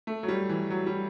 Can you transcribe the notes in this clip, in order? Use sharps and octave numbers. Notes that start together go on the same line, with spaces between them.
A3
F#3
G3
E3
F#3
G3